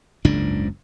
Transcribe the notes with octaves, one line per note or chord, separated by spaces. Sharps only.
F#1 C#2 G#2 D4